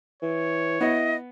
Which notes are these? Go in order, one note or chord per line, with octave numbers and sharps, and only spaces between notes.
E3 C#5
B3 E4 D#5